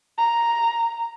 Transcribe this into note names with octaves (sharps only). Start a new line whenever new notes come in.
A#5